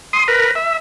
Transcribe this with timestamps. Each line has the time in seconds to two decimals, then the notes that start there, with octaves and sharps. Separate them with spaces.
0.13 C6 D#6
0.28 A#4 B4
0.55 E5